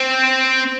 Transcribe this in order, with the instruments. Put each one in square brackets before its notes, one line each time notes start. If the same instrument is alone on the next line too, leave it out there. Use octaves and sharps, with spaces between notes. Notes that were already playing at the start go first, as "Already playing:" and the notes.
Already playing: [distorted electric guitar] C4